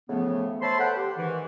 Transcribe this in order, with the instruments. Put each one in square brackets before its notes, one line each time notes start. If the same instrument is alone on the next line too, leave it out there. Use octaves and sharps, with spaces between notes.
[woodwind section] A2 C#3 E3 F3 A3 B3
C5 C#5 E5 A5 B5 C6
A4 B4 F#5 G5
G4
G#2 D#3 E3